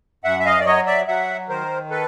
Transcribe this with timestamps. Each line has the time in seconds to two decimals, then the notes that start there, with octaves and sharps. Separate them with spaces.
0.24 F#2 E5 F#5
0.39 E5
0.45 D#5 F5
0.60 D5
0.66 F#3 C#5 D#5
0.87 D5 E5
1.07 F#3 E5 F#5
1.49 D#3 A#4 C5
1.90 A4 B4